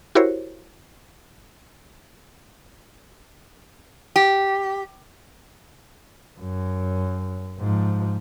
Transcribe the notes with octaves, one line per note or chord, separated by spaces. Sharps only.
E4 F#4 G4 A#4 C5 C#5
G4
F#2
G#2 F3